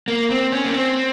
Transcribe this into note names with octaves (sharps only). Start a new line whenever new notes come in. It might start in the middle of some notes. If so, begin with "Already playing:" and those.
A#3
C4
C#4
A#3
C4